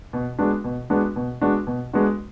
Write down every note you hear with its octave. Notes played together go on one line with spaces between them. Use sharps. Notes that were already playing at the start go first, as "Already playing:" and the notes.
B2
G#3 B3 D4 F#4
B2
G#3 B3 D4 F#4
B2
G#3 B3 D4 F#4
B2
G#3 B3 D4 F#4